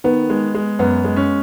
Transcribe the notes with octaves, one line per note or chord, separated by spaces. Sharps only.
D#3 B3
G#3
G#3
F#2 B3
G#3
C#4